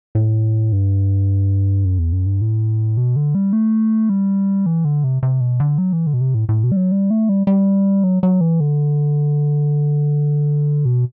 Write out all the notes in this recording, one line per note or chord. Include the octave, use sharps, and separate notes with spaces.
A2
G2
F#2
E2
F#2
G2
A2
B2
D3
G3
A3
G3
E3
D3
C3
C3
B2
D3
F#3
E3
D3
B2
C3
A2
A2
B2
G3
F#3
G3
A3
G3
G3
F#3
F#3
E3
D3
B2